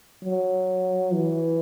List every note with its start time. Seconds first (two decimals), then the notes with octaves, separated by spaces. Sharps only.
0.24 F#3
1.14 E3